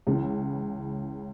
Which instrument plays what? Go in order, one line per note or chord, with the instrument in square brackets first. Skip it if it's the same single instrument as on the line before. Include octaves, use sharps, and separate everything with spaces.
[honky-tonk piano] C#2 C#3 E3